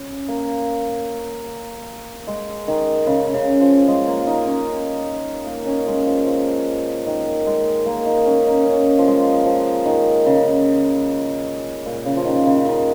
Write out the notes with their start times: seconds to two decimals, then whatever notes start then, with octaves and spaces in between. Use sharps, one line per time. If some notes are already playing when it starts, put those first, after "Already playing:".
Already playing: C#4
0.28 A#3
2.27 G#3
2.68 D#3
3.07 C#3
3.34 C#3
3.61 F3
3.88 G#3
4.07 A#3
4.27 D#4
4.47 C#4
5.46 A#3
5.67 C#4
5.87 G#3
6.06 F3
6.27 F3
7.07 D#3
7.46 G#3
7.86 A#3
8.06 D#4
8.26 C#4
8.46 D#4
8.66 C#4
8.98 F3
9.07 G#3
9.46 F3
9.85 D#3
10.26 C#3
11.86 A#2
12.06 C#3
12.17 F3
12.25 D#3
12.46 C#3
12.66 D#3